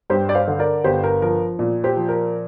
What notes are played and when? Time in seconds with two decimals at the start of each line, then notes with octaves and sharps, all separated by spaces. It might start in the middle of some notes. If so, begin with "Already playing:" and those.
0.10 G2 G4 C5
0.29 D5
0.35 C5 F5
0.47 D3
0.59 A#4 D5
0.84 G1 G4 C5
1.04 A#4
1.22 F3 A#4
1.59 A#2
1.84 G4 C5
1.97 F3
2.09 A#4